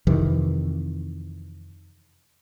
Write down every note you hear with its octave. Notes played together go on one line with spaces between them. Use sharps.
F2 C3 D#3 E3